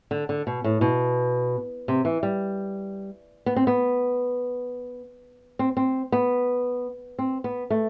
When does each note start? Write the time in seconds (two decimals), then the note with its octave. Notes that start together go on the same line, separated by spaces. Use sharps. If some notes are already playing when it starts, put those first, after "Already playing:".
0.11 D3
0.29 D3
0.47 B2
0.64 A2
0.81 B2
1.88 C3
2.05 E3
2.23 G3
3.46 B3
3.56 C4
3.67 B3
5.59 C4
5.77 C4
6.12 B3
7.19 C4
7.44 B3
7.70 A3